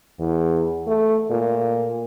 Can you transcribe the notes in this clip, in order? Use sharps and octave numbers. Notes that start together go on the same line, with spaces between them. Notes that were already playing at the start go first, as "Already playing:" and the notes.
E2
A3
A#2